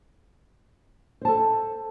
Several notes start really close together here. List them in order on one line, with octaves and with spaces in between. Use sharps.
C5 A5 A4